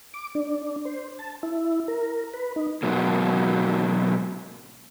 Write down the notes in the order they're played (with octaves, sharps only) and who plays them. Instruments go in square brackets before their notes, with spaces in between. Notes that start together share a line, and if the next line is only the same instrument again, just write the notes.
[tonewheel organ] D6
D4
C5
A5
E4
A#4
B4
D#4
[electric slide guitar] G#2 B2 F#3 A#3